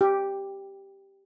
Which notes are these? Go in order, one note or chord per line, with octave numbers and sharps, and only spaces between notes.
G4